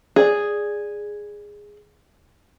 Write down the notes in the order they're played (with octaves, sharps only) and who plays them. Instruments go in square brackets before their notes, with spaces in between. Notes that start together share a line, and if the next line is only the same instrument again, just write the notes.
[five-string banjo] G#4 D5